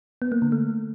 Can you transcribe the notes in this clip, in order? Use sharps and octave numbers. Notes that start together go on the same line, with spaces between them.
B3
A#3
D3
A3